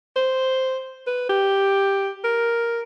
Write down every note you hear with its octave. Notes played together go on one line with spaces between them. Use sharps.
C5
B4
G4
A#4